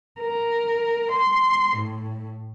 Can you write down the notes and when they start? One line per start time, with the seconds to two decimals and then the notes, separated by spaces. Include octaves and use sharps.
0.20 A#4
1.11 C6
1.76 A2